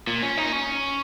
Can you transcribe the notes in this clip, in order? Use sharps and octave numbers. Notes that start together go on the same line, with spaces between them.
A#2
C#4
D#4
C#4